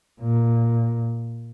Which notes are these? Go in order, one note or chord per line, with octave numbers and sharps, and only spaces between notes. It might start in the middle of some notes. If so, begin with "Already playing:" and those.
A#2